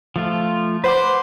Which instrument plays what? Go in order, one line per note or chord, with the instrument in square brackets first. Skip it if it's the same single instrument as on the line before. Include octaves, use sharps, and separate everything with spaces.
[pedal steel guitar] F3 A3 F4
[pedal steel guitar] B4 F#5 D6 [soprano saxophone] C5